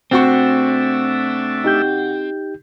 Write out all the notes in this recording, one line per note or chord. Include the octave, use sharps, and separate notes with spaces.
C3 A3 C4 D4 F#4 E5 C#6
D#4 G4 G6